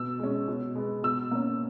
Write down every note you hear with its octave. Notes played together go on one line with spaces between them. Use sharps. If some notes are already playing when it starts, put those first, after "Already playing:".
Already playing: B2 E6
G#3 C#4
B2
G#3 B3
B2 E6
A#3 C#4